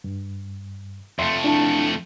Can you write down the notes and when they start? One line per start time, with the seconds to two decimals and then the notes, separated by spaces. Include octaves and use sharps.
0.04 G2
1.19 F2 A3 E5 C6
1.44 D4 E4 A5